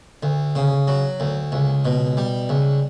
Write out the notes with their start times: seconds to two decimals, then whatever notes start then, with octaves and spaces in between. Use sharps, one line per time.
0.23 D2
0.56 C#3
0.88 F#3
1.20 D2
1.52 C#2
1.85 B2
2.17 G3
2.49 C#2